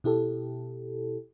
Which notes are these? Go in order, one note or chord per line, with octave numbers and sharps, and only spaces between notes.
B2 E4 G4 A4